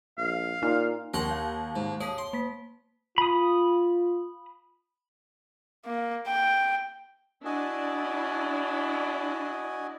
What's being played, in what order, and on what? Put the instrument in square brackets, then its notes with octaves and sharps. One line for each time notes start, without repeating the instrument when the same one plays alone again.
[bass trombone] A#1 [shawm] F5
[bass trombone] A#2 [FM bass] D#4
[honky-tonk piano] D#2 [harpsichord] A#4 F#5 C6
[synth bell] F5
[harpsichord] G#2
[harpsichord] G#4 [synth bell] C#5 A5
[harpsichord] C6
[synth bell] A#3 B6
[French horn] F4 [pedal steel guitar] B5 D#6
[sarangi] A#3
G5
[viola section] D4 E4 D5 [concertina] F#4 D#5 G#5